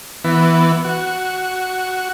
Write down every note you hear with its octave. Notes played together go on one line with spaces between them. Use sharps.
E3 B3
F#4